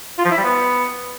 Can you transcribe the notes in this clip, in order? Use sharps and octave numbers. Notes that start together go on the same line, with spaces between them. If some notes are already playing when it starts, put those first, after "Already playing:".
F4
F3
E4
G3
B3